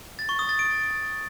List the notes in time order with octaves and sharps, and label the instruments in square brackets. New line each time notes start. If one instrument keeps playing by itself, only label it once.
[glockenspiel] A6
C#6
D#6
A6
D7